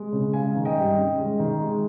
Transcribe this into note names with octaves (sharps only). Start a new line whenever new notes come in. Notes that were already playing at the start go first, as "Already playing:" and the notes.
Already playing: G#3
C#3
G#3 F5 G#5
D#3
D#5 G5
G2
C#4
G#3
D#3
G#3